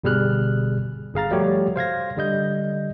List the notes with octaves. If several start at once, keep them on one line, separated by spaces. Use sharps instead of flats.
G1 B2 G3 G#4 F6 F#6
G1 G#4 F5 A#5 A6
F3 G3 A3 F#4 G4 C#5
C5 F5 G#6 A#6
D3 G3 D#5 G6